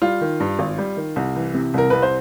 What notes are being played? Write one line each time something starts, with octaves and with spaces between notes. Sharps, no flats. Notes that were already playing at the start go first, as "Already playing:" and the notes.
G3 F4
D#3
G2
G#1
G3
D#3
C2
E3
C3
C2 A#4
C2 B4
C5